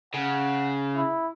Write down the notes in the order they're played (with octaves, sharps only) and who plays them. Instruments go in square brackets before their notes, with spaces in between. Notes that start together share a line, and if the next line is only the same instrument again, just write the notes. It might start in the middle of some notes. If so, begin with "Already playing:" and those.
[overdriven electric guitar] C#3 [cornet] F#5
[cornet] E4